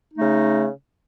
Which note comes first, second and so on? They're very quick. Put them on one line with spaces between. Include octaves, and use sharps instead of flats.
D#4 A3 C#3